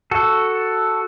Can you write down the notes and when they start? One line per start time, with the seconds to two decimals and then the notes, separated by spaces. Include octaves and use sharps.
0.11 F#4 A4